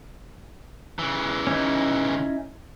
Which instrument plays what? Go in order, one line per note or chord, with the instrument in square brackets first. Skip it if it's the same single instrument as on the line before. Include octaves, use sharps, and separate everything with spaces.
[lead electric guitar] C#3 E3
[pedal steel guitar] C#4 D#4 E4